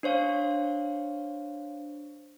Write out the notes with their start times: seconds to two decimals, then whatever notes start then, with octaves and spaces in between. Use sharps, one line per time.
0.03 D4 C5 C#5 F5